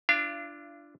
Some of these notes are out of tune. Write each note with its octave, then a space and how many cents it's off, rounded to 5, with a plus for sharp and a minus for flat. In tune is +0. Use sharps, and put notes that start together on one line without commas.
D4 +0 F4 -40 F5 -35